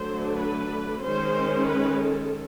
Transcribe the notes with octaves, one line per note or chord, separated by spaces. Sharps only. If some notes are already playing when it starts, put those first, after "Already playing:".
Already playing: D3 F#3 A3 D4 C5
B4
D#3 G#3 C#4 C5
B4
A4